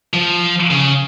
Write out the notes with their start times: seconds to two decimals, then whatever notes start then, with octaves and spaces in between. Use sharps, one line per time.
0.14 F3
0.70 C#3